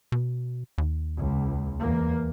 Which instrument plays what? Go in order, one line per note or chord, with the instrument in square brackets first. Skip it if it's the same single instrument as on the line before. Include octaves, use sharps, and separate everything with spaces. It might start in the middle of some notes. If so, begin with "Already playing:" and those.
[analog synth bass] B2
D#2
[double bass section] C#2
E2 A#3